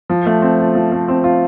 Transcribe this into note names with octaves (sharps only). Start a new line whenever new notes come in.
F3
A3
C4
F4
F3
A3
C4
F4